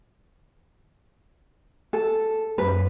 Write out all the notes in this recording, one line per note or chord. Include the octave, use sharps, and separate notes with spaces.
A4
F#2 B4